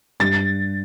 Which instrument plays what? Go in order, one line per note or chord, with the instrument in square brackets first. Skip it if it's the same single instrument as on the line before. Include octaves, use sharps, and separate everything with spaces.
[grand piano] G2 [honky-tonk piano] A6